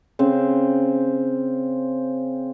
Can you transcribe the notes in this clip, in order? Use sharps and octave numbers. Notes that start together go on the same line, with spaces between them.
C#3 C4